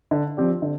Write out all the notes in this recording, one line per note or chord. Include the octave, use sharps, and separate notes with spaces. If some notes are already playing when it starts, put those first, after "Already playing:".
D3
F3 C4 G4 D5
D3